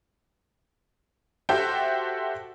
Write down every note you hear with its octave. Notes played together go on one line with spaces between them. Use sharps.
F#4 G4 A4 C5 E5 G5